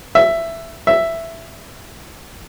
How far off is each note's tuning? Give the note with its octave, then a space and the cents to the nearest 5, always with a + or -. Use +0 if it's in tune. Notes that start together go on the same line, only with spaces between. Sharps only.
E5 +10
E5 +5